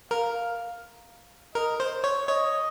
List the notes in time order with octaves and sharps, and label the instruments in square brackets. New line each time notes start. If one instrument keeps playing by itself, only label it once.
[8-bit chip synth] A#4 [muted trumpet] F5
[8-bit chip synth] A#4 [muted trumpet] D#5
[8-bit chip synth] C5
C#5
[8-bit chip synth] C#5 [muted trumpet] D#5